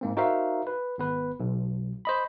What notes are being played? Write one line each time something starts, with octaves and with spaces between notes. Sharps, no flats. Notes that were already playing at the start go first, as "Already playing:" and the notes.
G#2 A#3 C4
D#4 F#4 A#4 C5 E5 F5
B4
G#1 B3 B4
B1
C5 D#5 B5